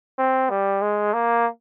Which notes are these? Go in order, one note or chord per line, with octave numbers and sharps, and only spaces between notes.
C4
G3
G#3
A#3